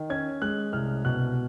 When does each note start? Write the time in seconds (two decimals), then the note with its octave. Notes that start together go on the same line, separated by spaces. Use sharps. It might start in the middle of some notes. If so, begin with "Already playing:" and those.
Already playing: D#3
0.10 C#4 G#6
0.42 G#3 F#6
0.73 C2 F6
1.05 B2 F#6